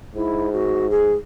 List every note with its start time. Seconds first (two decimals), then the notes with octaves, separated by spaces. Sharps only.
0.15 G#2 E4
0.53 F#4
0.91 G#4